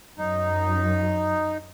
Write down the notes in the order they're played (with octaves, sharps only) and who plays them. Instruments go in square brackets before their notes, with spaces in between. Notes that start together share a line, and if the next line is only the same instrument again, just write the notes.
[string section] F#2 [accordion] D#4